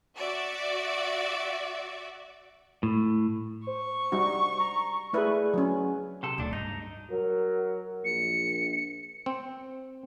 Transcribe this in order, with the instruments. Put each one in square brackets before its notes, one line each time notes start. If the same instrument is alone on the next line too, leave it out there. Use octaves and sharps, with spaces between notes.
[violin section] F#4 D5 E5
[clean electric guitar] A2
[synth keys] C5 [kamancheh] C#6
[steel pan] G3 D#4 F#4
[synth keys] A#5
[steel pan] A3 E4 B4 [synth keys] G#4 D5
[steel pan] F#3 C#4
[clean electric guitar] C3 A4
[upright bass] D1 [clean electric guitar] B1 D4
[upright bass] G2 [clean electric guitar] D#4
[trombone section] F#3 A#4
[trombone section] A#1 [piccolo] C#7
[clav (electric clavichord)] C4